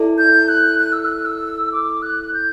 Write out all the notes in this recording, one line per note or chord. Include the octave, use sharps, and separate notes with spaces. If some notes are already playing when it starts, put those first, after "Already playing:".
Already playing: E4 A4 D5
G6
F#6
F#6
E6
F#6
E6
D6
F#6
G6